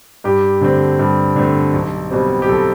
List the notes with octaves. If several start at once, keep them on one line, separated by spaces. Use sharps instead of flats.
G2 G4
D3 A3 C4
G2
D3 A3 C4
B1
B2 G3 C4
G4
B1 A4